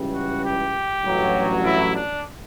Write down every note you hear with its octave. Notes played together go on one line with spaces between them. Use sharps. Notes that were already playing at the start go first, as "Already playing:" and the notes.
Already playing: C#2 C#3 E3 G3
F#4
G4
A1 G2 F#3
E4
D4